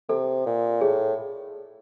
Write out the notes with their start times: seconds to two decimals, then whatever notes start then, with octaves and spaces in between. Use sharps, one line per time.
0.09 C3 A4
0.46 A#2
0.81 A2 G#4